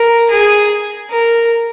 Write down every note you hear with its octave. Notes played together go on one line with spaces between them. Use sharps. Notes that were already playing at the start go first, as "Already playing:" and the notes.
Already playing: A#4
G#4
A#4